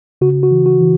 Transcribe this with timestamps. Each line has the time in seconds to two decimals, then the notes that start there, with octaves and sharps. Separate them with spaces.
0.21 C#3 F#4
0.43 F#4
0.51 E3
0.66 F#4
0.81 E3